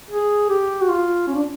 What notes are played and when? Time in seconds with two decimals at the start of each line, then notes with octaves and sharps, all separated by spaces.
0.11 G#4
0.50 G4
0.82 F#4
0.89 F4
1.28 C#4
1.35 D4